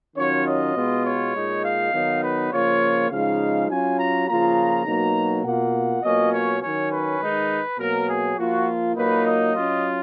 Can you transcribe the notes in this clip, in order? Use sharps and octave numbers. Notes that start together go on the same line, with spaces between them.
D#3 F#3 C#4 F4 C#5
D#5
B2 G#3 B3 F4
C#5
A#2 G#3 D#4
F5
D#3 F#3 B3 D#4
B4
C#3 F3 A#3 F4 C#5
C#3 F3 G#3 D#4 F5
F#3 C#4 F4 G#5
A#5
C#3 F3 A#3 F4 A#5
B2 F#3 A#3 D#4
B2 A#3 F4 F#5
B2 F#3 A#3 C#4 F4 D#5
C#5
D#3 F#3 C#4 C#5
B4
D#3 G#3 D#4
B2 F#3 A#3 A#4
G#4
F3 A#3 F4 F#4
A#2 F#3 A#3 D#4 B4
D#5
F#3 C#4 F4